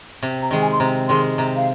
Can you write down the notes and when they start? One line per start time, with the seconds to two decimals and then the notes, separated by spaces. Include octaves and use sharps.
0.23 C3
0.42 A#5
0.51 D#3 G#3
0.61 G#5
0.72 C6
0.80 C3 A#5
1.08 D#3 G#3 C6
1.38 C3 A#5
1.56 F5